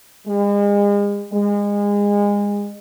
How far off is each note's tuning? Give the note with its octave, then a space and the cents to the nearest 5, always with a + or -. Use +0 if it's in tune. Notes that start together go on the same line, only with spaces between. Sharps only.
G#3 -40
G#3 -30